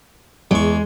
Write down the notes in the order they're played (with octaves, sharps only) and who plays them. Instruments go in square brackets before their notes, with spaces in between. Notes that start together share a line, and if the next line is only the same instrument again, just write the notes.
[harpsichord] E2 C#6 [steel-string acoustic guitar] G#3